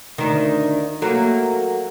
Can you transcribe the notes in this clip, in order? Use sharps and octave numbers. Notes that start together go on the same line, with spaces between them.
D2 D#3
F#3 A3 A#3